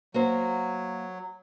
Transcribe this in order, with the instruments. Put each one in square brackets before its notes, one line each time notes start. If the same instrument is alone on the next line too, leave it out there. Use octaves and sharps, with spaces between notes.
[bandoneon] F#3 [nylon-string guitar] A#3 F#4 C5